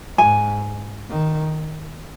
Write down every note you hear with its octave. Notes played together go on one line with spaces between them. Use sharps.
G#2 G#5
D#3